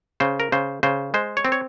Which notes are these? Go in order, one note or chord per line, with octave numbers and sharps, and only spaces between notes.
C#3 C5
A#4
C#3 C5
C#3 C5
G#3 C5
C#5
C4
C#5